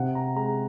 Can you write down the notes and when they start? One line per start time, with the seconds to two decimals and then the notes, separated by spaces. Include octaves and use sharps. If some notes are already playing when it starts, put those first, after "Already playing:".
Already playing: C3 F#5
0.15 A#5
0.36 G#3 A#5